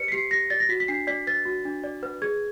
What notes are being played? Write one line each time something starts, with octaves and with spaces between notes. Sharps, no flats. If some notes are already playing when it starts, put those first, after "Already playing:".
Already playing: G4 B4 D5 C#7
B6
G4 C7
G4 A#6
D5 A6
A#6
F#4 B6
B6
D4 C7
D5 B6
B4 A6
F#4
D4
D5
B4
G#4 G#6